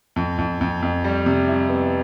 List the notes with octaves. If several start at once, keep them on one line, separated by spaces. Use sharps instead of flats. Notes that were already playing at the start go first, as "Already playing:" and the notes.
F2
F2
F2
F2
G3
C3
E4
B3